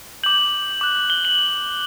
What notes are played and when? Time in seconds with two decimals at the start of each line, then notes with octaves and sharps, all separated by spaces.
0.23 D6 G6 F#7
0.81 D6 F#6
1.10 G7
1.25 F#7